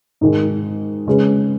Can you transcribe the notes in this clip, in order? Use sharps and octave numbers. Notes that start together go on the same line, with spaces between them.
G#2 D#3 G#3
C#3 G#3 C#4 G#4 B4